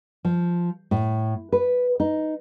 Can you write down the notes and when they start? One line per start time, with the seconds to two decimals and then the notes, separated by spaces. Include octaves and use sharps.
0.25 F3
0.91 A2
1.52 B4
2.00 D#4